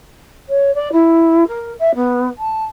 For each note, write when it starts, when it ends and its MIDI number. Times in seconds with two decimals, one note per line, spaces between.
0.49 0.73 73
0.74 0.92 74
0.92 1.47 64
1.47 1.73 70
1.79 1.94 76
1.95 2.27 59
2.38 2.63 81